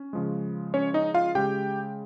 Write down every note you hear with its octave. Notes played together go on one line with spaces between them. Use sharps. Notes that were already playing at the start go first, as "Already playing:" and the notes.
Already playing: C#4
C#3 F3 G#3
C#4 C#5
D#4 D#5
F4 F5
C#3 G#3 G4 G5